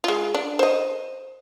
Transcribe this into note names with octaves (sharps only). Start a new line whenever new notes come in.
G#3 F4
D4
C5 D#5